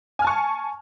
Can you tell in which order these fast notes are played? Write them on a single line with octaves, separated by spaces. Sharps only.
G#5 F6 A5 C#6